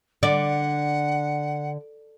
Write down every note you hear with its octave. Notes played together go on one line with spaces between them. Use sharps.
D3 D5 F#5